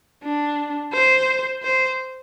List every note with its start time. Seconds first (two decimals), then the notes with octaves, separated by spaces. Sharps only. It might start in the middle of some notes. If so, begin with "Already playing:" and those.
0.23 D4
0.93 C5
1.63 C5